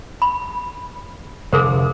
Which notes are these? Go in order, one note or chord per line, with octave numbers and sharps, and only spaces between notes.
B5
F1 D3 G#4 A#4 C5